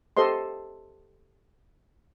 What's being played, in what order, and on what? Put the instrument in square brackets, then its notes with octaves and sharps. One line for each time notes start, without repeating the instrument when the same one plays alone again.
[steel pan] G4 A4 C5 D#5 C6